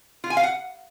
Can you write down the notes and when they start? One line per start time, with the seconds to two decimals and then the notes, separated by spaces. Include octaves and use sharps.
0.24 F4
0.30 G#5
0.37 F5
0.43 F#5